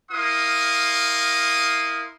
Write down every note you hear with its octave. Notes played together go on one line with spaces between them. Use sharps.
E4 A#4 F5 C6 D#6